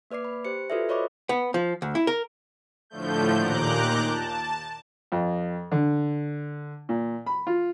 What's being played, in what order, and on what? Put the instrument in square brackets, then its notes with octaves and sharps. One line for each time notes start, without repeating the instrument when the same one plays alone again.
[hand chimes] A#3 B4 D5 D6 C7
B5
G4 C5 C#7
F4 F#4 A4 B4 D5 E5
C5 C#5 D#5 B5 C#6 D6
[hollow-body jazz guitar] B3
F3
D2
E4
A#4
[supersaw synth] A2 D3 F3 A3 G6
D#2 A#2 A#5 D6 F#6 G6
A5
[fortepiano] F2
D3
A#2
B5
F4